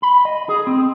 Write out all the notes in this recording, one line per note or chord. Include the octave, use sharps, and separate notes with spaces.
B5
D#5
G#4
C4